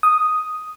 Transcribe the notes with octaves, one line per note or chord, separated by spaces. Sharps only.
D#6